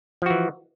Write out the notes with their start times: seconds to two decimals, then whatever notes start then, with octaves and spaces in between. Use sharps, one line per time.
0.22 F3
0.26 F#4
0.30 E3